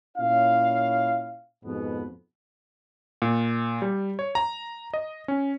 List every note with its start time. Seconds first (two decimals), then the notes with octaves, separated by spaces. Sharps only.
0.17 A#2 C#4 E4 C#5 F5
1.65 F2 G#2 B2 B3
3.22 A#2
3.82 G3
4.19 C#5
4.35 A#5
4.94 D#5
5.28 C#4